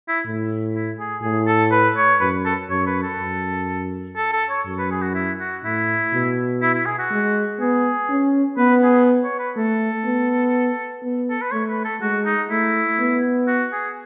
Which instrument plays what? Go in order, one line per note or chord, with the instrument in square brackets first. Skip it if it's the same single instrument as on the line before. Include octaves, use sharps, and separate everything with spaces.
[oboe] E4
[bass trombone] A2
[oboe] E4
G#4
[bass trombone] A2 [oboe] G#4
[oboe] A4
B4
C#5
[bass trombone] F#2 [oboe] B4
[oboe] A4
[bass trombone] F#2 [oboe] C#5
[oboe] B4
A4
[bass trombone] F#2
[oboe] A4
A4
C#5
[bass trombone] F#2
[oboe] B4
G#4
F#4
E4
F#4
[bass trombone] A2 [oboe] E4
[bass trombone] B2
[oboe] E4
E4
G#4
F#4
[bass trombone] G#3
[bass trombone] B3 [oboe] G#4
[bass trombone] C#4
[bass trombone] B3 [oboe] B4
[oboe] G#4
C#5
B4
[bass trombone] A3 [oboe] A4
[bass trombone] B3
B3
[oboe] A4
B4
[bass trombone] A3 [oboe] C#5
[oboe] B4
A4
[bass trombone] G#3 [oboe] F#4
[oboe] D#4
[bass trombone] A3 [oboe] E4
[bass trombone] B3
[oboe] F#4
G#4